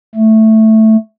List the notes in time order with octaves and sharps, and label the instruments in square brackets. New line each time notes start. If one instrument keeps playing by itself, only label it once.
[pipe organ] A3